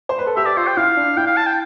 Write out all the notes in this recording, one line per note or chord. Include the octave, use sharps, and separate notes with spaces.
C5
B4
A4
G4 E5
D5
F4 C5
G5
E4 F5
D4
E4 G5
F5
A5
G5